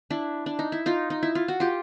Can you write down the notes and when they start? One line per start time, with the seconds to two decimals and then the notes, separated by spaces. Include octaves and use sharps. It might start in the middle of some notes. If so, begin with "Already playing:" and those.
0.10 D4 E4
0.46 D4
0.59 D#4
0.72 E4
0.86 D#4 F4
1.10 D#4
1.23 E4
1.35 F4
1.48 F#4
1.60 F4 G4